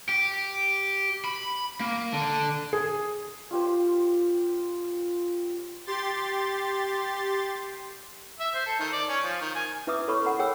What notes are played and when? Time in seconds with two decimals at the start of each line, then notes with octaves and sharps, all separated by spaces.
0.09 G4
1.25 B5
1.80 A#3
2.13 D3
2.73 G#4
3.51 F4 G4 C5
5.86 G4 C6 A6
8.40 E5
8.54 C5
8.66 A4
8.79 D#3
8.92 D5
9.08 C#4
9.24 F3
9.41 D#3
9.55 G#5
9.87 E4 B4 E5 D6 D#6
10.08 A4 B4 C#5 B5 C#6
10.25 A4 A#4 F#5 A#5 B5
10.39 G#4 C#5 G5 E6